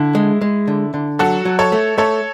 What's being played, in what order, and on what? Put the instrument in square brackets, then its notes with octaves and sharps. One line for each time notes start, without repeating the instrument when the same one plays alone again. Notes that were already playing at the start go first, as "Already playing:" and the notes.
Already playing: [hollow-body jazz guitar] D3 [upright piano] E4
[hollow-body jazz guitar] G#3
G#3
D3
D3
[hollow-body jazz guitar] F#3 [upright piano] F#4 A4
[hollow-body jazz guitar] F#3
[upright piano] A4 C#5
[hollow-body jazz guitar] A3
[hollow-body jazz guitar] A3 [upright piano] A4 C#5